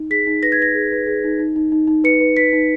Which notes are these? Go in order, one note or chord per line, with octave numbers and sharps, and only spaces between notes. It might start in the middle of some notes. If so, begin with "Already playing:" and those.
Already playing: D#4
G#4 B6
D#4
B4 A#6
G#6
B4 A#6
G#4
B4
G#4
D#4
D#4
D#4
D#4
D#4
B4 C#7
B4
B4 B6
D#4